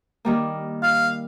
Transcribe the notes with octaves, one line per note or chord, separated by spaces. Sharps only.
D#3 G3 A#3
F5